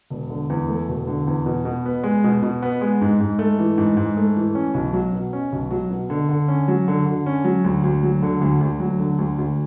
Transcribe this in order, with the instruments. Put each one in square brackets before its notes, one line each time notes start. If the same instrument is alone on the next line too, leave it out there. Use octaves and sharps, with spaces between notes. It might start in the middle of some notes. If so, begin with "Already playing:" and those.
[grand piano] E1
D3
E2
A3
E1
D3
E2
B2
B2
B3
G#3
B2
B2
B3
G#3
G#2
G#2
A3
E3
G#2
G#2
A3
E3
C#4
B1
F#3
B2
C#4
B1
F#3
B2
D3
D3
C#4
F#3
D3
D3
C#4
F#3
D2
D2
F#3
D3
D2
D2
F#3
D3
D2
D2